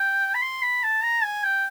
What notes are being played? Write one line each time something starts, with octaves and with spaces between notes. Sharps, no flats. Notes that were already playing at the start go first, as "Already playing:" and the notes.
Already playing: G5
B5
C6
B5
A5
A#5
G#5
G5